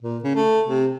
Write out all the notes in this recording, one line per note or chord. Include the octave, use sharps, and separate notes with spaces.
A#2
C#3
A3
C3